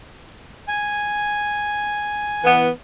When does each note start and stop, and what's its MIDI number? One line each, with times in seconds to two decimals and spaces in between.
0.68 2.48 80
2.44 2.67 52
2.44 2.67 59